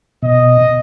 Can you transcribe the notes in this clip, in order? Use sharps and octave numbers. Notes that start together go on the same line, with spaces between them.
B2 D#5